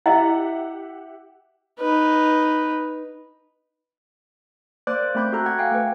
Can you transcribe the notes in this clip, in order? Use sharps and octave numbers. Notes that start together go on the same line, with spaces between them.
E4 G4 D#5 E5 F#5
D#4 B4
A#3 C5 D5 D6 F#6
A3 C4 B5 D6 G6
F#4 A4 A#5 F#6
F#5 G#6
F5 G5 G#5
A3 B4